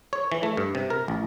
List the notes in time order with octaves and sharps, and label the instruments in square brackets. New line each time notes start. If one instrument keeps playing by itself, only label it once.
[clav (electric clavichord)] C#5
E3
A3
G2
C3
A#4
A1